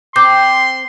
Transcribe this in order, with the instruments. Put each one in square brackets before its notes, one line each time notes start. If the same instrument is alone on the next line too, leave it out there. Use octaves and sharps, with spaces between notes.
[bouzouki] C4 [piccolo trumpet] C6 [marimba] D6 G6